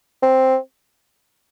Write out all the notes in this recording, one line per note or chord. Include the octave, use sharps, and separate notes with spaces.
C4